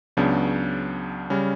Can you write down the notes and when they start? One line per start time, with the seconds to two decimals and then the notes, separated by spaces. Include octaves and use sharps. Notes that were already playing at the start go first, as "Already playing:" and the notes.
0.17 C#2 C#3 F#3 B3 D4
1.30 C#3 G3 C#4